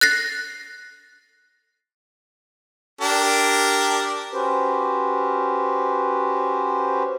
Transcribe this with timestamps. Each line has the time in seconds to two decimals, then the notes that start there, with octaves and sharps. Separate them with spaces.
0.01 F#6 A6 A#6 C7
3.01 D4 G4 A#4
4.33 C#4 F#4 G4 B4 C5